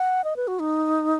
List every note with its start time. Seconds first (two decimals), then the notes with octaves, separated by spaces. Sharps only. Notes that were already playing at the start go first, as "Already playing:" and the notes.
Already playing: F#5
0.24 D#5
0.36 B4
0.48 F#4
0.60 D#4